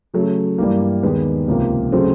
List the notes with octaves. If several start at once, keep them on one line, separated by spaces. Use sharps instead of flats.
C#3 F#3 A3
G2 E3 G3 A#3
D#2 D#3 G#3 B3 D#4
C#2 C3 F3 A#3
C#3 F#3 A3 C4